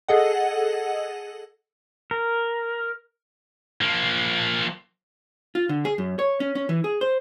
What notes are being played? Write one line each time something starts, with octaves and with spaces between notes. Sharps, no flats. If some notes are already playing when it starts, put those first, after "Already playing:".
G#4 A4 D#5 F#5
A#4
F3 A#3
F4
D3
G#4
F#2
C#5
C#4
C#4
E3
G#4
C5